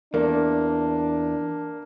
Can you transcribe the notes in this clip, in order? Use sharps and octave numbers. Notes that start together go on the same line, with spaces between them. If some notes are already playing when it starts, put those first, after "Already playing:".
E2 A#3 D4